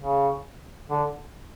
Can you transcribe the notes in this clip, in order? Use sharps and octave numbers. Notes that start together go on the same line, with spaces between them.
C#3
D3